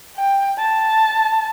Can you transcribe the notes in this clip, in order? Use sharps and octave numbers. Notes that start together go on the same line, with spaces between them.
G5
A5